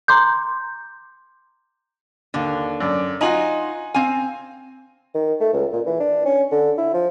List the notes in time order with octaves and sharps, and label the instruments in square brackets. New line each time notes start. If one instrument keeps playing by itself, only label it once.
[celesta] A#5 C6 D6 G6
[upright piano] D#2 [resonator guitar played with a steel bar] D3
[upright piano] F#2 D5 D6
[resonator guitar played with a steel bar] D#4 F4 F#4 [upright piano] D#5 G#5 F#7
[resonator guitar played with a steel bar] C4 G#5 [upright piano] F5
[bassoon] D#3
A3
C#2
A#2
E3
D4
C#4
D3
E4
F3